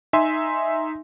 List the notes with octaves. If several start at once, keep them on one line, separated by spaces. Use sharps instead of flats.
D#4 E5 G#5 C6